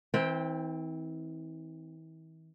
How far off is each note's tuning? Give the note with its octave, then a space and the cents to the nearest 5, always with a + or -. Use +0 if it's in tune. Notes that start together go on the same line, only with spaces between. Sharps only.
E3 -40 C4 +0 G5 +0